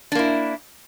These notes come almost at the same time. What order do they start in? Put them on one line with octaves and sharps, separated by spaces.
D4 A#3 E4